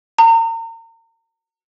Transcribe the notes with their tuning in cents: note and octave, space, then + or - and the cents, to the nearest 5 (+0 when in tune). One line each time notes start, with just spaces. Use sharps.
A#5 -35